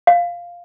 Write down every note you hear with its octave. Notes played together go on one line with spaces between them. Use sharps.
F5